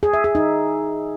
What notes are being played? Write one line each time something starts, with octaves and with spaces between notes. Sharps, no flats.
G#4
E5
G#4
D#4